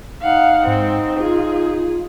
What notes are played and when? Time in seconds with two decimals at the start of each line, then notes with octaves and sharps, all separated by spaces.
0.22 D#4 F5 F#5
0.67 G#2 C4
1.20 F4 G#4